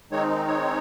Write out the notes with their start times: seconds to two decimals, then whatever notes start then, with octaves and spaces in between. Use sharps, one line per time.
0.12 D#3 G#3 C4 D#4 C#5
0.47 C#5